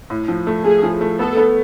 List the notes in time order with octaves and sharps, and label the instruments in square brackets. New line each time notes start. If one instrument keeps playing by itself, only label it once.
[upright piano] A2
F3
A3
[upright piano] A3 [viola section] G#4
[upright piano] F3
A3
[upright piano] B3 [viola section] A4
[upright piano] B3